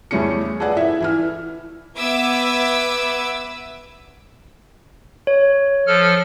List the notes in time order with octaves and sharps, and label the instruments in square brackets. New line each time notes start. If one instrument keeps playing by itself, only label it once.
[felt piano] E2 G3 A3 C#4 G#4 C#7
G#4 A4 B4 D5 F#5
E4 E5
E3 E4 F6
[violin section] B3 B4 E5 D6 E6 G#6
[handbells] C#5
[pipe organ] F3 A4 F6